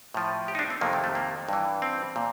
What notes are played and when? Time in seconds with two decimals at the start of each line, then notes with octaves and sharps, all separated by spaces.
0.14 A2 F3
0.48 G4
0.55 D#4
0.59 D4
0.70 C4
0.81 F2 C3 D#3 A#3
0.93 A3
1.04 A3
1.15 A#3
1.49 G2 E3
1.82 C4
2.16 A#2